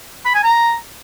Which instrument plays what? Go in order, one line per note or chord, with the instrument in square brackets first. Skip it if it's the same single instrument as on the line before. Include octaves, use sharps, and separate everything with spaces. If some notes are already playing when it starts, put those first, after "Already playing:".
[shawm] B5
G#5
A#5